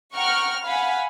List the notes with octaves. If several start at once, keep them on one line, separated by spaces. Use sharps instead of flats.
F#5 G5 A#5 C#6 F6
F5 F#5 G#5 B5